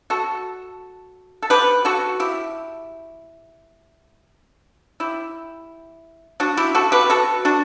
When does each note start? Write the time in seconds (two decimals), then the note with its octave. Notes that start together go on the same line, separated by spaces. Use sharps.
0.10 F#4 A4
1.42 A4
1.50 G4 B4
1.85 F#4 A4
2.20 E4 G4
5.00 E4 G4
6.40 D4 F#4
6.57 E4 G4
6.75 F#4 A4
6.92 G4 B4
7.10 F#4 A4
7.45 D4 F#4